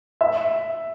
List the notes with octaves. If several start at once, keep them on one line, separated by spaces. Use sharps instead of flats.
E5